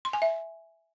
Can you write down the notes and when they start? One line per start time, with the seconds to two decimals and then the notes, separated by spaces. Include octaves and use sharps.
0.05 C6
0.13 G#5
0.22 E5